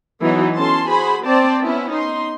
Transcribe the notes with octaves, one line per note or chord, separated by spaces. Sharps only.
E3 F#3 B3 D#4
C#4 A4 A5 C6
F#4 G#4 C5 G#5 B5
C4 C5 D5 G5 A5
B3 C#4 E4
D#4 C6